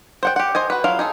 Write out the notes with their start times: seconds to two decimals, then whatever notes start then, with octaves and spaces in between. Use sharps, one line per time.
0.23 C5 F#5 G5
0.36 G4 F#5
0.55 C5 D#5 G#5
0.70 F#4 B4
0.84 F#3 E4 F4 F5
0.99 D#4 G#4 A4